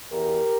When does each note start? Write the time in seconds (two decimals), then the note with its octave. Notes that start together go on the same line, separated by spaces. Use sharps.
0.11 E2 E3 G4 A#4